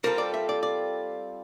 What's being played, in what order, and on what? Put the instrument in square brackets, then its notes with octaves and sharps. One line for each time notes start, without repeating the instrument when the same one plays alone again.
[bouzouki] G3 C4 F4 A4 [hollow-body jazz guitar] A#4
[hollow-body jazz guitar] D5
E5
D5
D5